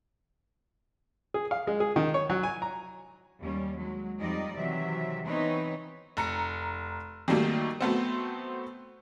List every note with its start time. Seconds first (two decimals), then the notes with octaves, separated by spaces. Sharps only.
1.34 G#4
1.51 F5
1.67 G#3
1.80 G#4
1.96 D#3
2.14 C#5
2.30 F#3
2.43 G#5
2.62 A#5
3.41 D#2 G3 C#4
3.76 F#3 G#3
4.20 F2 F3 G3 D#4 D5 D#5
4.56 C3 D#3 E3 F#3 E5
5.26 E3 B3 C4 D#4 B4 C#5
6.17 F1 A#5 C#7
7.28 D#3 F#3 G3 A3 A#3
7.81 F#3 A3 B3 C4